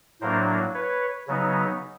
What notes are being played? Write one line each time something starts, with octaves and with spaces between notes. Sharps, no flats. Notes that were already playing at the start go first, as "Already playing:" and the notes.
A2 F#3 A#3 D4 A#4 C5
B4 C#5
C#3 F#3 B3 D#4